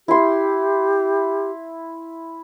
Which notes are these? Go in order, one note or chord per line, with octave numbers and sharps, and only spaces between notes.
E4 G4 C6